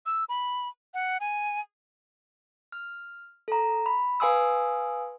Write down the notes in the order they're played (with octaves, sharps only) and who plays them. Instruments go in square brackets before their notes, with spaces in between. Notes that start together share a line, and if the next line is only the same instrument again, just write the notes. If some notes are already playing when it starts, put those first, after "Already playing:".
[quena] E6
B5
F#5
G#5
[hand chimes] F6
A4 A#5
B5
B4 F5 G#5 C6 D#6 E6